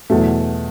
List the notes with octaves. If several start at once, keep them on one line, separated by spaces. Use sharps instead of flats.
E2 B2 F#3 A3